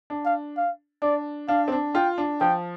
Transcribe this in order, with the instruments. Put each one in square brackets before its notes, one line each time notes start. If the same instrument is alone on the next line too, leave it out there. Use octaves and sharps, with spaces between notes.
[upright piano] D4
[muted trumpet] F5
F5
[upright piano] D4 [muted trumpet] D5
[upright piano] D4 [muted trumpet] F5
[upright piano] C4
D4
[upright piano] F4 [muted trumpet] G5
[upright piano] D4
[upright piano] F3 [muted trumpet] G5